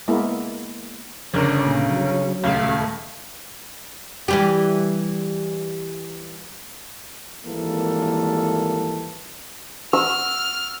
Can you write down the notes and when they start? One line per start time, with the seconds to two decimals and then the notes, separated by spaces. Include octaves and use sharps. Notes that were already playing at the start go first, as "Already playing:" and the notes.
0.08 G#3 A#3 B3 E4
1.34 G1 C#3 C#4 A#4 D5
1.66 A#2
1.90 F#3
2.44 D#1 C#2 A3 F5
4.28 E3 G3 G4
7.45 G#1 E3 G3 A#3 A4
9.93 E6 F6